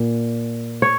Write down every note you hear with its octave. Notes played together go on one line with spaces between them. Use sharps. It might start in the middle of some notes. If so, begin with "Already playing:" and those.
Already playing: A#2
C#5